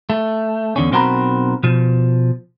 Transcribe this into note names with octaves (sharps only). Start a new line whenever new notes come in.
A3
E2 D3 C#4
B1 C4 F#4 A#4 A#5 B5
B2 F3